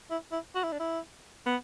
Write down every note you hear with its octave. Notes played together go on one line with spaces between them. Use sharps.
E4
E4
F#4
E4
D4
E4
B3